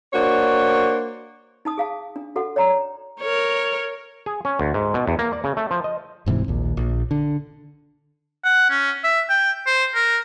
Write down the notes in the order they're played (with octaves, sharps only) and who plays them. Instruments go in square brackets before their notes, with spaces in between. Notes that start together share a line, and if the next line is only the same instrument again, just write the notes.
[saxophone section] A#3 D4 F#4 C5 C#5
[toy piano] D#4 A5 D#6
G#4 F5 A5
D4
F#4 A4 F#5
C#5 D5 G5 A#5 C6
[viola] A#4 C#5
[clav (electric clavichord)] G#4
C#4
D2
G#2
B2
E2
A#3
D5
C#3
A3
F3
D#5
[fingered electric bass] D1 G#2 C3 E3
A#1 D#2
A#1
D3
[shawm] F#5
C#4
E5
G5
C5
A#4